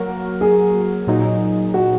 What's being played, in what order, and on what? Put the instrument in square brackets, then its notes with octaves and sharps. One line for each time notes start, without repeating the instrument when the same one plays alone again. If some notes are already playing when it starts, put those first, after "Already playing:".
Already playing: [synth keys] F#3 A#3 F#4 [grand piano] A#4
[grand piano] G#4
[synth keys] A#2 F#3 D#4
[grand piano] F#4